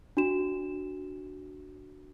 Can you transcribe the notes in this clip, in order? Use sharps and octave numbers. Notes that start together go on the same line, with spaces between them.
D4 F#4 E7